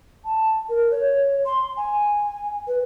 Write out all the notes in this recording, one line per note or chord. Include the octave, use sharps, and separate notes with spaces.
A5
A#4
C#5
C6
G#5
B4